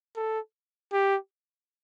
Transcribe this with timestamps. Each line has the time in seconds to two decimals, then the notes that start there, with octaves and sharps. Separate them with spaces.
0.16 A4
0.93 G4